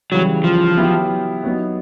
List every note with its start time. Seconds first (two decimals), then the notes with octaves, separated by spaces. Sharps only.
0.11 C#3 E3 F#3 G3
0.44 F3
0.77 F#3 B3 E4 G4
1.44 F#3 B3 D#4